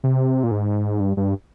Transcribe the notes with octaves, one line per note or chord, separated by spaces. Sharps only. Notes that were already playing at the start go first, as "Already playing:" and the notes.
C3
A#2
G#2
G2
G2